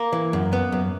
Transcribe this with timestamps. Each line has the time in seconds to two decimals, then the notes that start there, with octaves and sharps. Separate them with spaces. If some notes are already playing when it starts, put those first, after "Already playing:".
Already playing: A#3
0.13 E3
0.33 F#2
0.53 B3
0.72 F#2